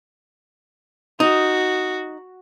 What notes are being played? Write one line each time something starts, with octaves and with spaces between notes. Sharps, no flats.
D#4 F#4